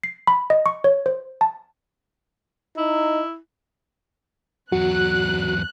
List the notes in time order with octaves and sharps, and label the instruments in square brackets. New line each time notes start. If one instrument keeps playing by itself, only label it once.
[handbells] C7
B5
D#5
C#6
C#5
C5
A5
[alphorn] D#4 [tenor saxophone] E4
[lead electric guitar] E2 F#3 [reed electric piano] F#4 [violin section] F#6